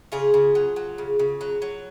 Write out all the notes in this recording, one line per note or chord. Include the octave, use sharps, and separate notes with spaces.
C#3 F4 G#4
C#3
F#3
F#3
C#3
C#3
F#3
F#3